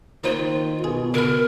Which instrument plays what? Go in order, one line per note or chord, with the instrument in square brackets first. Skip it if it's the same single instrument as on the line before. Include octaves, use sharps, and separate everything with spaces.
[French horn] D#3 [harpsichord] A#3 D#4 C5 [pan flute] F4
[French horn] B2 [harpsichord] G#4
[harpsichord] D3 B5 [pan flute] A#4